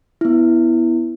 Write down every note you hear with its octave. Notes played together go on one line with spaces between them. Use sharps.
B3 E4